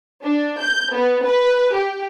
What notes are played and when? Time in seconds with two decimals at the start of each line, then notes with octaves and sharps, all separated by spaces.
0.23 D4
0.61 G6
0.92 B3
1.26 B4
1.75 G4